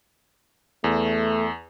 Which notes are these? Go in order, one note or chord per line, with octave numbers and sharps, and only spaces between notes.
E2 A3